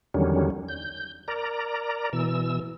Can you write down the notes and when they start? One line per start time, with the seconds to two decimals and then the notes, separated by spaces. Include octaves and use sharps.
0.14 E2 D3 D#3 F#3 G3 C#4
0.68 G6
1.28 A#4 D5 A#5
2.13 B2 E3 E6